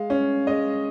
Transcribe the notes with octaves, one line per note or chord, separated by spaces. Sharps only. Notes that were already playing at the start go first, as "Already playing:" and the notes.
Already playing: G#3 F5
C#4
G#3 D#5